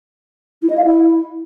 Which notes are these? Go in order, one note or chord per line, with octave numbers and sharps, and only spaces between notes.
E4
D#5
F5
E4